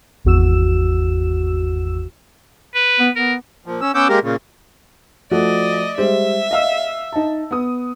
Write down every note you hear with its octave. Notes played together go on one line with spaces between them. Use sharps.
G#1 E2 F#4 E6 E7
B4
B3
B3 A#4
A#2 F3
C#4 E6
B3 C#4 F#5 D6 E6 G6
G#3 A#3 G4 A#4
A#2 C#3
F3 A3 F#4 D5 D#5
G3 G#3 C5 E5
D#5 F5 E6
D#4 A5
B3 D#6